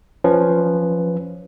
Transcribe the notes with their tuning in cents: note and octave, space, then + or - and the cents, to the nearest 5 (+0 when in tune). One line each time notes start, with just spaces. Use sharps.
F3 +0 C#4 +0 B4 +0